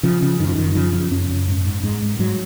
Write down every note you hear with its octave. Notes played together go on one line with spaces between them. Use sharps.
C#3 F3
C#3
F#2 D#3
F3
F#2 D#3
C#3 F3
C#3
F#2 C#4
F#2
G#2
G#2
G#2 G#3
G#2
G#2 F#3